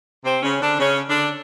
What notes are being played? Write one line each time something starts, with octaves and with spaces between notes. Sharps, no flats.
C3 C4
C#3 C#4
D3 D4
C#3 C#4
D3 D4